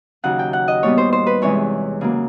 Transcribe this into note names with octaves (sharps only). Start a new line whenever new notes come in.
D#2 C#3 F#3 F#5
G5
F#5
D#5
A#2 G3 B3 C#5
C5
C5
B4
E2 C3 E3 G#3 C#5
C#3 F#3 A#3